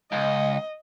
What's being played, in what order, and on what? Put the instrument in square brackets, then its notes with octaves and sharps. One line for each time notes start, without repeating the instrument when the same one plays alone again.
[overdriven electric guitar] C#2 [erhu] D#5